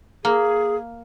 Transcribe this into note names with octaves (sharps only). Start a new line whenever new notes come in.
A#3 G#4